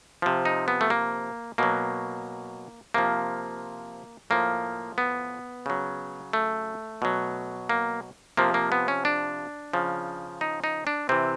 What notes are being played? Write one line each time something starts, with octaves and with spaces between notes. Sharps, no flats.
C3 F3
D#4
B3
A3
A#3
B2 F#3 A#3
C3 F3 A#3
A2 F3 A#3
B3
C#3 F#3
A3
B2 F#3
A#3
C3 F3 A#3
A#3
B3
C#4
D4
C#3 F3
D#4
D#4
D4
C3 E3 C4